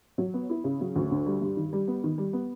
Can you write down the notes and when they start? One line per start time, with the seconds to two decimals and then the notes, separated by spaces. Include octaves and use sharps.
0.18 F#3
0.34 B3
0.50 E4
0.64 C#3
0.81 F#3
0.96 D2
1.11 D3
1.26 G3
1.42 G2
1.57 D#3
1.73 G3
1.88 B3
2.04 D#3
2.18 G3
2.33 B3